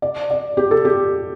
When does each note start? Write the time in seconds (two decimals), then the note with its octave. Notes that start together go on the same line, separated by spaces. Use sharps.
0.02 D5
0.30 D5
0.57 G4
0.71 A4
0.85 G4